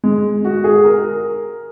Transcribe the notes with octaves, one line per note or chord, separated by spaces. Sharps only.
G#3
F#4
G#4
A#4